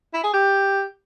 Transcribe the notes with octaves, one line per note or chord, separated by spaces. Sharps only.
E4
G#4
G4